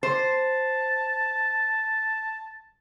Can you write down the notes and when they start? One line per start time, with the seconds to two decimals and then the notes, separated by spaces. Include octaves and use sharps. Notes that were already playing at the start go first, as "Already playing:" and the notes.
0.03 C5 A5